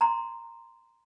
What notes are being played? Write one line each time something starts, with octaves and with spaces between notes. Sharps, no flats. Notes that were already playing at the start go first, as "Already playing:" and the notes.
A#5 C6